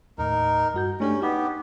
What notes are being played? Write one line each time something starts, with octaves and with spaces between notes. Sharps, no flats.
D#2 A2 D#4 A#4
G2 F#4 G6
A3 C#4 D4 G4
B3 D#4 G4